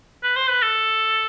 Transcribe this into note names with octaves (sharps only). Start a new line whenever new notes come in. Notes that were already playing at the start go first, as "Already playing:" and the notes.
B4
C5
B4
A4